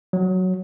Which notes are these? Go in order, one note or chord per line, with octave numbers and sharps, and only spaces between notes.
F#3